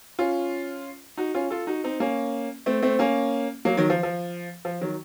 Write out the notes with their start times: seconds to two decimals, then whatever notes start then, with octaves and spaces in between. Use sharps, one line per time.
0.19 C#4 F4
1.17 D#4 F#4
1.34 C#4 F4
1.50 F4 A4
1.67 D#4 F#4
1.84 C4 D#4
2.00 A#3 C#4
2.66 A3 C4
2.83 A3 C4
2.99 A#3 C#4
3.65 F#3 A#3
3.77 D#3 F#3
3.90 F3
4.03 F3
4.65 F3
4.81 D#3 F#3